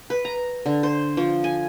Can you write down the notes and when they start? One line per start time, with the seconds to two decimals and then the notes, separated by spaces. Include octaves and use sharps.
0.10 B4
0.25 A#5
0.66 D3
0.83 C5
1.17 F3
1.44 G#5